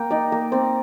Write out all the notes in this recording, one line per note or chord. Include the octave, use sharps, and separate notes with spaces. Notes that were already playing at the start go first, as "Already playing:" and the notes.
Already playing: A#3 G5
D#4 D5
A#3
C4 D5